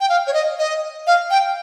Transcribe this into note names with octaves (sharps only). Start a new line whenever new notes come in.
G5
F5
C#5
D#5
D#5
F5
G5